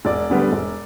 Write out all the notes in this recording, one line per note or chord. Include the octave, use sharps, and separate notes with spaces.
E1 D5
D2 D3 G3 B3
E1